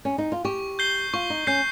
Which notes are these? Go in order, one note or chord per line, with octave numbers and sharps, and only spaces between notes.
C#4
D#4
F4
G4 C#6
G6 C7 G7
F4 C#6
D#4
C#4 G6 C7 G7